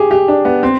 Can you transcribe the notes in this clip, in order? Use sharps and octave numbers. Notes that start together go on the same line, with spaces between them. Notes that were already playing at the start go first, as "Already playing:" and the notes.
Already playing: G4 G#4
G4
D4
B3
C4